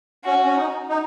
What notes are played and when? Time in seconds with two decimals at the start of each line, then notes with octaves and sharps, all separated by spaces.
0.25 C#4 F#4
0.45 C#4
0.57 D#4
0.89 D#4